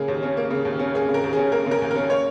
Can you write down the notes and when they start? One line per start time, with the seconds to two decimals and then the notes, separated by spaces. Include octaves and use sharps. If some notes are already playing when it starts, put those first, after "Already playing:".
Already playing: C#3 A#3 G#4
0.08 D#2
0.23 C#4
0.37 A#3
0.50 C#3
0.65 D#2
0.79 C#4
0.94 A#3 G#4
1.09 C#3
1.14 A#4
1.24 D#2
1.33 C#4 G#4
1.52 A#3 A#4
1.66 C#3
1.71 A#4
1.82 D#2
1.91 C#4 A#4
2.10 A#3 C#5